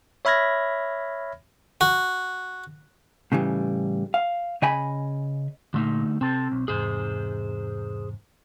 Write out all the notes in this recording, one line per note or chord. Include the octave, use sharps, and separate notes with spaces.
C#5 E5 B5 F6 G#6 A#6
F#4
A2 C#3 E3 G3
F5
C#3 D#5 G#5 B5
A#2 D3 A3 D#4
C3 C4 A4
B1
E2 G#2 C3 G#4 C5